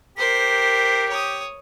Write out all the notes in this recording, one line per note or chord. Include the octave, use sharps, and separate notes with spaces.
G4 A#4 C5 B6
C#5 D#6